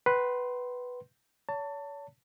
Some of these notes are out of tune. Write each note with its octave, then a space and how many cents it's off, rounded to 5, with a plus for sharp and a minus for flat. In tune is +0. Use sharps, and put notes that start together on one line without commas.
B4 +0 F#5 +45 C6 +0
C#5 +40 A5 +25